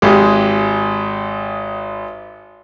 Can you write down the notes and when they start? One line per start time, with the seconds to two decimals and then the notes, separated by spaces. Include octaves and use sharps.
0.02 G#1 G#3 G4